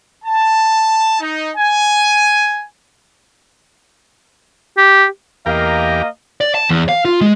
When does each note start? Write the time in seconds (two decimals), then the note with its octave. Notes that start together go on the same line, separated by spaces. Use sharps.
0.24 A5
1.20 D#4
1.57 G#5
4.78 G4
5.46 E2 A#3 G4 A#4 D#5 F5
6.41 D5
6.55 A5
6.69 E2
6.89 F5
7.05 F4
7.21 G#3